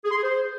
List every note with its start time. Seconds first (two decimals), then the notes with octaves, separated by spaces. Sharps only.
0.05 G#4
0.11 C6
0.17 G#4
0.23 C5